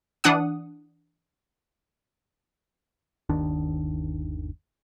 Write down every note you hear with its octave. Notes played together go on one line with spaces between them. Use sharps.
E3 D4 F#5 D#6
G1 D#2 D#3 D4